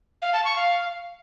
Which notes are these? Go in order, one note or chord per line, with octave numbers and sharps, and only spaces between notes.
F5
A5
C#6
F5